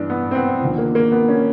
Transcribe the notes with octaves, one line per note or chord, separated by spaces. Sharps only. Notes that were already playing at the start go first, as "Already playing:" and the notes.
Already playing: G2 E3 D4
B3
C4
B3
D#2 D3 F3
A#3
A#3
B3
C#4